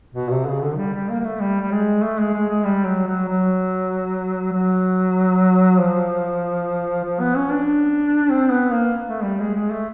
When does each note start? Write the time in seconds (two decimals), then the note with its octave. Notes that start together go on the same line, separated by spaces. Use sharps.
0.15 B2
0.31 C3
0.46 C#3
0.62 D3
0.77 G3
0.94 G3
1.09 A#3
1.20 A#3
1.24 A3
1.40 G3
1.62 G3
1.72 G#3
2.03 A3
2.19 G#3
2.34 G#3
2.49 G#3
2.65 G3
2.86 F#3
3.07 F#3
3.28 F#3
4.53 F#3
5.79 F3
7.04 F3
7.20 B3
7.36 C#4
7.51 D4
8.30 C4
8.50 B3
8.72 A#3
9.07 A3
9.23 G3
9.40 G#3
9.55 G#3
9.71 A3